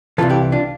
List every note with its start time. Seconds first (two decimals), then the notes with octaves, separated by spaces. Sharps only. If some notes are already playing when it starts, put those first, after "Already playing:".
0.18 C2 C3 E3 F4 A4
0.29 E4 G4
0.52 D4 F4